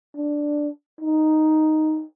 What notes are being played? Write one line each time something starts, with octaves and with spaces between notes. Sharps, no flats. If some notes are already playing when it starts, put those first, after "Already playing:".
D4
D#4